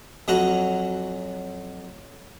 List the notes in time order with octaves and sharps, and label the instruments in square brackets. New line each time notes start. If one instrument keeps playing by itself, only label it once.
[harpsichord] F2 F#3 C#4 F#4 F#5 A#5